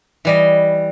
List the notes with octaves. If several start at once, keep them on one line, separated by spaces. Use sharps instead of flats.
E3 G3 D#5